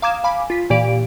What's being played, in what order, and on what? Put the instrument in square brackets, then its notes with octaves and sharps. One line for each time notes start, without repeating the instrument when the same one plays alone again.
[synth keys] F5 A#5 D6 D#6 G#6 E7
F5 G#5 B5 D6
F4 B6
A#2 E3 G4 D5 D7